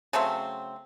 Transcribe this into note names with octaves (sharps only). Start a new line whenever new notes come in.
C#3 F#3 A3 C4